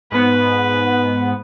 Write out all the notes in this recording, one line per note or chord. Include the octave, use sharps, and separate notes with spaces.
G#2 B3 B4